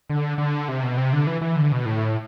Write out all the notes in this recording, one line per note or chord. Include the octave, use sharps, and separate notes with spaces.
D3
D3
C3
B2
C3
D3
E3
E3
D3
B2
A2